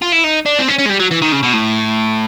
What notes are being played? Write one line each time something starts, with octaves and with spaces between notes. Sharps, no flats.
F4
E4
D#4
D4
C4
C#4
C#4
G#3
G3
F#3
E3
D#3
C#3
B2
A2